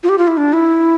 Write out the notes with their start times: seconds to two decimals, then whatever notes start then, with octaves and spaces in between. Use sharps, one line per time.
0.03 F4
0.09 G4
0.18 F4
0.28 E4
0.37 D4
0.53 E4